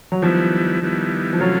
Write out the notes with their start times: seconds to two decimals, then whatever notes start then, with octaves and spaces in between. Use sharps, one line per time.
0.12 F#3
0.22 D#3 F3 G3 B3 E4
0.82 D#3 G3 B3 E4
1.33 F3
1.40 C3 E3 F#3 A3 C#4 F4